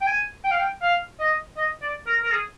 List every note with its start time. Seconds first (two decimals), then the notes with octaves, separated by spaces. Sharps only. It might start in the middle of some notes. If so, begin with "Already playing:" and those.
0.01 G5
0.07 G#5
0.44 G5
0.51 F5
0.59 G5
0.82 F5
1.19 D#5
1.57 D#5
1.82 D5
2.06 A#4
2.23 A#4
2.31 G#4